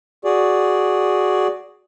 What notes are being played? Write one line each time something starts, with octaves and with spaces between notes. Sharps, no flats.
F#4 G#4 D5